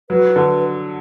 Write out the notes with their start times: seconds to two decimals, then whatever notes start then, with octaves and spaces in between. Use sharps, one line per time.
0.10 F#3 B4
0.36 D3